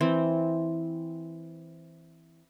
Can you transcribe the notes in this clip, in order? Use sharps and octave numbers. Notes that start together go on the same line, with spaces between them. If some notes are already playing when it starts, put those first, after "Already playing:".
E3 C4